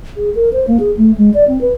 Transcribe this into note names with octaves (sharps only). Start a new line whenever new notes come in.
G#4
A#4
C5
A#3
G#4
A3
G#3
D5
C4
B4